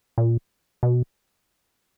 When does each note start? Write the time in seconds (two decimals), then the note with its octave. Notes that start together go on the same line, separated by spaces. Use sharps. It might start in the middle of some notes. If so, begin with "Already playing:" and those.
0.18 A#2
0.83 B2